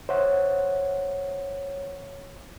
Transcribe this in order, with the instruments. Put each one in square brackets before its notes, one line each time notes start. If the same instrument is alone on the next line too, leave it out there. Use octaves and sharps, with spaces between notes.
[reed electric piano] C5 E5 F#5 [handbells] C#5